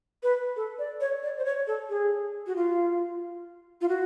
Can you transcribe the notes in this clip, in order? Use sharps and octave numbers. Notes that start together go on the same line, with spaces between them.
B4
A4
D5
C#5
D5
C5
C#5
A4
G#4
F#4
F4
F4
F#4